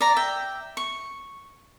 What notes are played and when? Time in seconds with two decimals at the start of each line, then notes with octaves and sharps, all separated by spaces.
0.01 D5 A#5
0.16 E5 G5
0.77 C#6